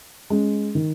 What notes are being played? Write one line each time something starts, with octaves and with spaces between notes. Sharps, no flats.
G#3 C#4
D#3